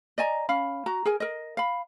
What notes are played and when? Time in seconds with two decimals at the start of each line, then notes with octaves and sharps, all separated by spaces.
0.18 D5 D#5 G#5 A#5
0.49 C#4 F5 B5
0.86 F#4 A#5
1.05 G#4 A#4 G#5
1.20 A#4 D#5
1.57 F5 B5